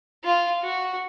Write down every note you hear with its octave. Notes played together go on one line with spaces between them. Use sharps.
F4
F#4